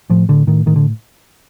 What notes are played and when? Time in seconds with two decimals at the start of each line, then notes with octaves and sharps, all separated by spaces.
0.10 A2 F3
0.29 A2 D3
0.47 A2 D#3
0.66 A2 D#3
0.76 D3